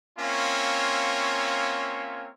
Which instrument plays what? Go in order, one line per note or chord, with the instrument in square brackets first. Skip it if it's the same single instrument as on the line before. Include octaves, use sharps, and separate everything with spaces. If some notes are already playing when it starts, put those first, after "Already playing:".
[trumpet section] A#3 C4 C#4 F4 C#5 E5